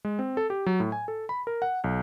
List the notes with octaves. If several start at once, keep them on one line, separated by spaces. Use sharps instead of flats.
G#3
C4
A4
G4
F#3
A2
G#5
A4
B5
A#4
F#5
B1